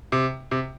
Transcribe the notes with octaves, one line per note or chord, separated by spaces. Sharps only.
C3
C3